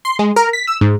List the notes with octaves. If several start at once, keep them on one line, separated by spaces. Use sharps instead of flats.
C6
G#3
A#4
B6
E6
G#2